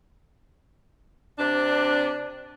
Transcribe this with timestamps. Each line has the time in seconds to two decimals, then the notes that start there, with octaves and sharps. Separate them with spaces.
1.39 C3 D4